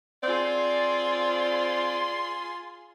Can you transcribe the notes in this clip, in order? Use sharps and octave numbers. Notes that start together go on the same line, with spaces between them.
C4 F4 G#4 D5 C6